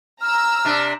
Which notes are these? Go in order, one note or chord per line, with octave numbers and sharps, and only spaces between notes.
A#5 E6 F6
C3 D4